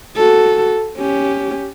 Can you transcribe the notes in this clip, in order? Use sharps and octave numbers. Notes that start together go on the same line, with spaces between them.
F#4 A4
C#4 G4